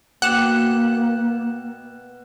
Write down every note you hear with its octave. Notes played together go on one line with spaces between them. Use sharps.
B2 A#3 F#5 G5 D6 F#6 E7